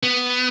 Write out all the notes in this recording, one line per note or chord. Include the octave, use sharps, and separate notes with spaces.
B3